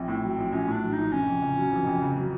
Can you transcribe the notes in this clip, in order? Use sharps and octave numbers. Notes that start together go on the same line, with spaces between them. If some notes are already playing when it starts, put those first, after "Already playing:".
Already playing: A#1 C4
A2
F#3
A#1
A#1 C#4
A2
D4
F#3
D#4
A#1
F1 C#4
F2
C#3
F#3
F1
F2
C#3
F#3